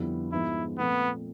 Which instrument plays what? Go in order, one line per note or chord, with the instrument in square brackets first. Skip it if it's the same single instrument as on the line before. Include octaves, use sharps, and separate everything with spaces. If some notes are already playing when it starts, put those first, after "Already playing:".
Already playing: [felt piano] F2 D3 G3 B3 E4
[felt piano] G#2 F3 G#3 B3 [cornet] E4
[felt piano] A#2 F3 A3 C4 [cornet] B3